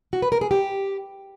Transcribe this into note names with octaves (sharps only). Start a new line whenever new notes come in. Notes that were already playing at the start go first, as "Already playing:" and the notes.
F#4
B4
A#4
G#4
G4